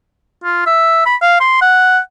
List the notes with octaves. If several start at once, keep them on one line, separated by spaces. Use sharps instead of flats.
F4
E5
B5
F5
C6
F#5